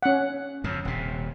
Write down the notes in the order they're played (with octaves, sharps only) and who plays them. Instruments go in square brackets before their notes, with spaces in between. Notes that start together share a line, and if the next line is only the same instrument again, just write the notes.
[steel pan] C#4 F#5
[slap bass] F2 C#3
D#1 C3